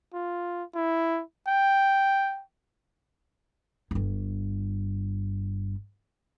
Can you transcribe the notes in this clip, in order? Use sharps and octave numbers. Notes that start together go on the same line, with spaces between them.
F4
E4
G5
G1 G2